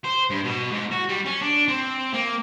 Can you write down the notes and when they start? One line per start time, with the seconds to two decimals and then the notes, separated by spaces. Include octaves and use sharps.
0.04 C5
0.30 G2
0.44 B2
0.71 G#2
0.91 F#4
1.08 G3
1.25 C#4
1.42 D4
1.68 C4
2.13 A#3